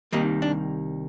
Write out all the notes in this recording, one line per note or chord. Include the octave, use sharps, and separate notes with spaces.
C2 C3 D#3 G3 A#3 D#4
D4